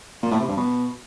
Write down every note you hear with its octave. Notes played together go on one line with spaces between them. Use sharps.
A#2
A2
C3
G2
B2